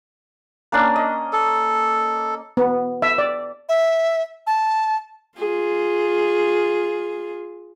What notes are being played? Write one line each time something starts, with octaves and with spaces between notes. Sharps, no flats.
A#3 C#4 D4
D#5
A4
B3
E5
D5
E5
A5
F4 G#4